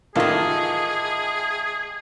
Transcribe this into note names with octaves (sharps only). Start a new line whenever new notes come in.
A1 D#3 F4 G#4 A4 D#5